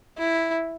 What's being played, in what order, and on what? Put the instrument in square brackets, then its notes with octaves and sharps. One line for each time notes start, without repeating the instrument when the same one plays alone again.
[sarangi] E4